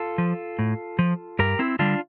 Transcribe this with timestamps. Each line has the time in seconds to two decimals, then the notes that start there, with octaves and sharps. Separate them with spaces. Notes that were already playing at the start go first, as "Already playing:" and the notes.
Already playing: F4 A4
0.18 F3
0.59 A2
0.99 F3
1.39 G2 G4 A#4
1.59 C4 E4
1.79 D3 G3 D4 F4